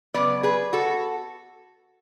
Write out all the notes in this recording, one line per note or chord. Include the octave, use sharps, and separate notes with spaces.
C#3 F#3 B3 B4 D5
G#4 B4
F#4 A4